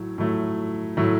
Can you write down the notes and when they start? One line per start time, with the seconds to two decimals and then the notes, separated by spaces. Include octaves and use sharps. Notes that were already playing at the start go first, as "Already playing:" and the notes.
Already playing: A2 F#3 A3
0.18 A2 F#3 A3
0.97 A2 F#3 A3